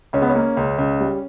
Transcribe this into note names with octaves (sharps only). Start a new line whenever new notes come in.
C#2 C#4
B3
C#4
A#3
C#2
C#2
G3